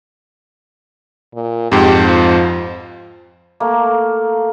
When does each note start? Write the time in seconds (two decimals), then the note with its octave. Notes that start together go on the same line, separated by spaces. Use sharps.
1.35 A#2
1.72 F2 G#2 G4
2.05 F3
3.60 A3 A#3